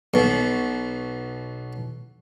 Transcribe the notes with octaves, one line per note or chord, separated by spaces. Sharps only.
B1 B2